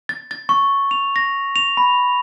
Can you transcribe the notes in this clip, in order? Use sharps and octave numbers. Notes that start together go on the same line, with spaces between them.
A6
A6
C#6
F7
A#6
F7
B5